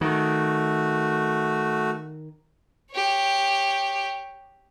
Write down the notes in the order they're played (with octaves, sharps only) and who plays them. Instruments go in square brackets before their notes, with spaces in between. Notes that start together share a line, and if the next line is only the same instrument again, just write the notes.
[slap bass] D#3 [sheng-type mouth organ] A3 F#4
[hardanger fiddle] G4 C#5